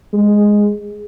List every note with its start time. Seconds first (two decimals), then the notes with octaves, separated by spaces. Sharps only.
0.14 G#3